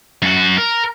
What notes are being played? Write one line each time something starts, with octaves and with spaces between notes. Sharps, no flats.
F#2 F#4
A#4